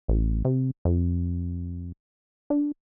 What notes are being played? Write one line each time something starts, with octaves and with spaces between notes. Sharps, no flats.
A1
C3
F2
D4